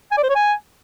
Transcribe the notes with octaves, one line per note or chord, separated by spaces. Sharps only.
G#5
D5
C5
C#5
G#5